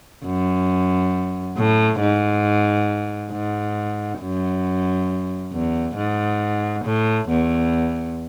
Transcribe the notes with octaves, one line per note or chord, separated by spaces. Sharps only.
F#2
A2
G#2
G#2
F#2
E2
G#2
A2
E2